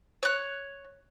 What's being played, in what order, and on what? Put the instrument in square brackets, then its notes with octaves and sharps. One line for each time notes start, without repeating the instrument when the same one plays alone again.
[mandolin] C#5 F#6